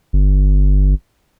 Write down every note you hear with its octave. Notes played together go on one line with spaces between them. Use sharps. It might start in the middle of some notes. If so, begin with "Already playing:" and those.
G1